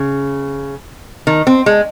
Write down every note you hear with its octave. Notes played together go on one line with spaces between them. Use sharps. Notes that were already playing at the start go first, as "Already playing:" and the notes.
Already playing: C#3
D#3
C4
G#3